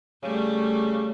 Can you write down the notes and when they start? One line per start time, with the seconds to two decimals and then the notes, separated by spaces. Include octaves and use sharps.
0.23 C#3 G3 A3